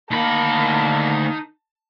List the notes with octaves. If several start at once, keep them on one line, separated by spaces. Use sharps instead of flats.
D2 A#3 D#4 A#4 A5 B5